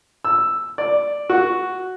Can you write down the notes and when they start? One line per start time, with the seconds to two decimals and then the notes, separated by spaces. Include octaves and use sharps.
0.25 E6
0.78 D5
1.30 F#4